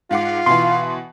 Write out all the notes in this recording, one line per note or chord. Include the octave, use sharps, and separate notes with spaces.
G#2 F4 F5 F#5 D6
B2 E3 C6